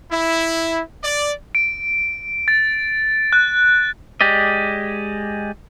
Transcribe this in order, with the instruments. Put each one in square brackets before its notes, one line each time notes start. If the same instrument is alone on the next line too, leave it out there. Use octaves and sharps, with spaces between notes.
[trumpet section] E4
D5
[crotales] D7
A6
F#6
[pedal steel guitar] G#3 G4 D5 D#5